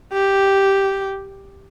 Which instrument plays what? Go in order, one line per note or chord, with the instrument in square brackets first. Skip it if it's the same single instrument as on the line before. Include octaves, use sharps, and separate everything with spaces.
[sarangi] G4